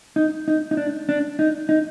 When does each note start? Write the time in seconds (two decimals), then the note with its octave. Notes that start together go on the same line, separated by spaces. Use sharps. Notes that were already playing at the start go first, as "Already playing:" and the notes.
0.16 D#4
0.48 D#4
0.71 D#4
0.77 D4
1.09 D4
1.39 D#4
1.69 D#4